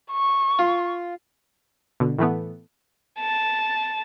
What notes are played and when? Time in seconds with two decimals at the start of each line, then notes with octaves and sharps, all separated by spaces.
0.12 C#6
0.59 F4
2.00 B2 D3
2.19 A2 E3 A3 B3
3.19 A5